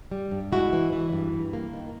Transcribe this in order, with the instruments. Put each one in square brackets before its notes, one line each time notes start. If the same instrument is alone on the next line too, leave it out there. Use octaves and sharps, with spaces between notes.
[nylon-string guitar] G3
G2
G#3 E4 F#4
E3
E3
G2
G2
A#3
D#3